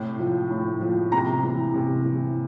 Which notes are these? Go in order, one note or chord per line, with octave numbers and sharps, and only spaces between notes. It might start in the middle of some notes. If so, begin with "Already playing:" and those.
Already playing: A2 C3
F3
A2
F3
C3 A#5
E3
C3
E3